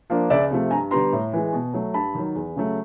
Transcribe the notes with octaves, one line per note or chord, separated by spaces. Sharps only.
F3 A#3 D4
C#2 D5 E5
C3 F3 A3
G2 G#5 A#5
D3 G3 B3 A#5 C6
A2
E3 G#3
B2
F#3 A3
G2 A5 B5
D#3 F#3
E2
C#3 F#3 A3